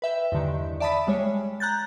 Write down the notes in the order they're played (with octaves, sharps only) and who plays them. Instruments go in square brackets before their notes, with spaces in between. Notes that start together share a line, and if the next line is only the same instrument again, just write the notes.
[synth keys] B4 E5 G5
E2 G2 D3 D#3
D5 E5 A5 B5 D#6 B6
G3 G#3 C#5
A#5 F#6 G6 A6